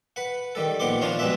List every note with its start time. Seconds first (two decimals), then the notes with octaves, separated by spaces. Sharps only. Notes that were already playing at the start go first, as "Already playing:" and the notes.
0.16 B4 F#5
0.55 D#3 G3 A4
0.80 A#1 D#3 B3 F#5 C6 D6
1.02 F3 D4 F4 C5 C#5 F5
1.19 G2 B2 G#3 B3 D4 E5